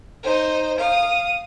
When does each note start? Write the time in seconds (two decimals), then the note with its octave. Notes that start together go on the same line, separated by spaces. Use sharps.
0.23 D#4 C5
0.79 F5 D#6